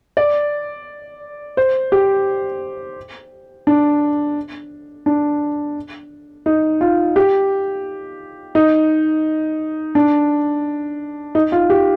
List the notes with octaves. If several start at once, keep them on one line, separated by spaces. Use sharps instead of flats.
D5
C5
G4
D4
D4
D#4
F4
G4
D#4
D4
D#4
F4
G4